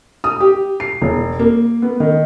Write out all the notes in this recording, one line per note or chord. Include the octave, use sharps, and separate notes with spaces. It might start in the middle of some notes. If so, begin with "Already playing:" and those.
D#6
G4
C7
E1
A#3
B3
D#3